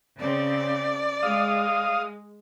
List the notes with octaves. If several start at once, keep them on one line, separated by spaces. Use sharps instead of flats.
C#3 C4 D5
G#3 F5 D#6